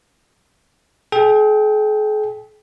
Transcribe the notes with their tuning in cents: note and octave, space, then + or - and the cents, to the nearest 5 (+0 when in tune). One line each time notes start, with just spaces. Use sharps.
G#4 +45 G5 +0